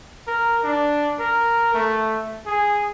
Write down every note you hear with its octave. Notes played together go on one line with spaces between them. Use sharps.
A#4
D4
A#4
A3
G#4